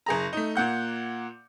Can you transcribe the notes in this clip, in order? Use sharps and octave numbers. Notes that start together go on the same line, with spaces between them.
F#1 G#4 A#5
A3 D#4
A#2 A#3 F#5 G6